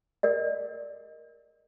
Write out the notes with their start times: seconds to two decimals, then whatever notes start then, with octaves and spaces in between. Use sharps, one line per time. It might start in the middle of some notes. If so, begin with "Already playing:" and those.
0.23 A#4 D5 D#5